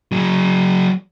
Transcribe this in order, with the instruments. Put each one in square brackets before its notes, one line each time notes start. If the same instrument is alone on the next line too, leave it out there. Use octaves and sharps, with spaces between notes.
[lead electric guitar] F#3 G#4